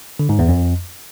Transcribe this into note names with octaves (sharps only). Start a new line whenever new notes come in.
D3
G#2
E2
F2